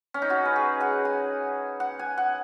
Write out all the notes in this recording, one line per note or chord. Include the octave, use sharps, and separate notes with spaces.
C#4
D#4
F#4
B4
G#4
F#5
G#5
F#5
G#5
F#5